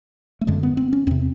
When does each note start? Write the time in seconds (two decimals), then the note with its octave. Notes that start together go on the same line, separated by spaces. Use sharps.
0.41 A3
0.47 F#2 D3 G#3
0.63 B3
0.77 C4
0.93 C#4
1.07 E2 C3 C4